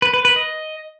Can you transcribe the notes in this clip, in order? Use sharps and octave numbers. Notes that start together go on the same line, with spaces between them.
B4
B4
B4
D#5